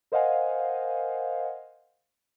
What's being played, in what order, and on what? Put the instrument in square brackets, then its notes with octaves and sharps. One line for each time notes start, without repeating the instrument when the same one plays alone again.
[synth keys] A#4 C5 D#5 F5 F#5 G#5